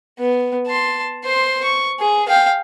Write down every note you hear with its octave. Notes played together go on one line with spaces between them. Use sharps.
B3
A5 C6
C5 C6
C#6
G#4
F5 G5